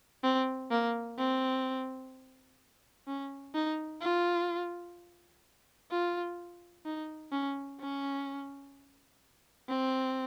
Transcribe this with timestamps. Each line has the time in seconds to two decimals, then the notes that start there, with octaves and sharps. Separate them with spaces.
0.23 C4
0.71 A#3
1.18 C4
3.08 C#4
3.55 D#4
4.01 F4
5.91 F4
6.86 D#4
7.32 C#4
7.80 C#4
9.69 C4